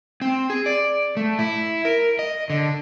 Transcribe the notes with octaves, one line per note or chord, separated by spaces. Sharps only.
C4
G#4
D5
A3
E4
A#4
D#5
D3